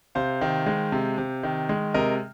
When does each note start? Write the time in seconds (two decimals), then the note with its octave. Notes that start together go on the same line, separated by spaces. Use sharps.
0.15 C3 C5 F5
0.41 D#3
0.66 G#3
0.92 C3
1.18 C3
1.43 D#3
1.69 G#3
1.94 C3 A#4 D#5